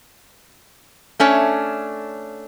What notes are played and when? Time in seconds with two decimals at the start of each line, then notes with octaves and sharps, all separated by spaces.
1.20 A3 C#4 D4 C#5